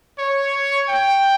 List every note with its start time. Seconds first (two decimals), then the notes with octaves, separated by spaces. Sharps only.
0.18 C#5
0.89 G5